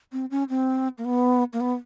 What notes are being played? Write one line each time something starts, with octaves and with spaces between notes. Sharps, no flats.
C4
C#4
C4
A#3
B3
A#3
B3